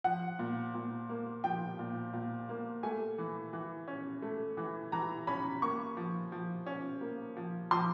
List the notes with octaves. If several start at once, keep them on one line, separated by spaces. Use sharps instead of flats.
F3 F#5
A#2
A#2
A#3
F3 G5
A#2
A#2
A#3
A3 G#5
E3
E3
C#4
A3
E3
E3 A#5
C#4 B5
A#3 C#6
F3
F3
C#4
A#3
F3
F3 C6